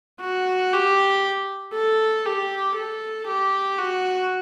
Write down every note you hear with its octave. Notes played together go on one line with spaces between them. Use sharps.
F#4
G4
A4
G4
A4
G4
F#4